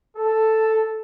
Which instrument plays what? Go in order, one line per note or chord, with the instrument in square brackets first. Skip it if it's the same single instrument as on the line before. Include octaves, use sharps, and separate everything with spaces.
[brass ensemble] A4